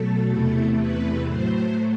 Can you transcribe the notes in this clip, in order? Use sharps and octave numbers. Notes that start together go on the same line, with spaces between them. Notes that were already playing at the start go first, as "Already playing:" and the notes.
Already playing: B2 F#3 A3 A4
E2 C3 E3 A3
B4
A2 F#3 A3 C5